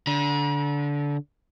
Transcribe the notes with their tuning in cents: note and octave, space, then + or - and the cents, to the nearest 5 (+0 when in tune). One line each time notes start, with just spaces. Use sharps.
D3 -20 A#5 +45